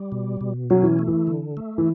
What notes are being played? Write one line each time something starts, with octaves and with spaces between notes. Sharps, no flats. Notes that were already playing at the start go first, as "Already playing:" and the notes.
Already playing: G3
B2
B2
F#3 C#4
E3
A3
E3
D3
A3
E3